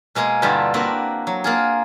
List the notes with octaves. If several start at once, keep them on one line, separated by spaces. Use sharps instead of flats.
B2 G#3 A#3 G#4
G2 D3 G3 E4 F4 G4
A#3 C4 D4 F#4 B4
F#3
A#3 F4 G#4